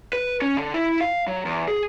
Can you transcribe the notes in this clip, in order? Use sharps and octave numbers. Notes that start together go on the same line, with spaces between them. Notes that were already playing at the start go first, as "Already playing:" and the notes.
B4
C#4
D3
E4
F5
F#3
E2
G#4